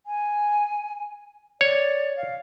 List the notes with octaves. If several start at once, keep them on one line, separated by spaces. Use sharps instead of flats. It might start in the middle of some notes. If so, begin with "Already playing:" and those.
G#5
C#5 D5
F5